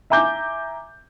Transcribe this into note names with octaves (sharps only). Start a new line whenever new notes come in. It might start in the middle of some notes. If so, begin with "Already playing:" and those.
E5 G#5 A#5 D6 G6